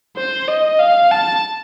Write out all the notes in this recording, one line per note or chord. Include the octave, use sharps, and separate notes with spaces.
C5
D#5
F5
A5